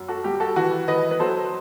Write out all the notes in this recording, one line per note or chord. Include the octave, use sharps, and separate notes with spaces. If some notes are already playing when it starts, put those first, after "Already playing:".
Already playing: F#2
F#4 A4
G3 G4
F#4 A4
E3 F#4
E3 B4 D#5
B4
F#3 A4 C5